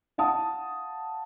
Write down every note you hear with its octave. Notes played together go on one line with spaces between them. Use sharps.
F5 F#5 A5 D#6